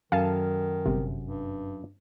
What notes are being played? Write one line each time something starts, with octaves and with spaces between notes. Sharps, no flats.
F#2 D#3 A4 F5 G#5 A5
G1 C3
G2